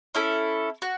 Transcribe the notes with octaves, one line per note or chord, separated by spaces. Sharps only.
C#4 E4 A4
F#4